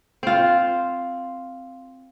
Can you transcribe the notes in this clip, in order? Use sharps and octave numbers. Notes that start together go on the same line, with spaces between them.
C4 F4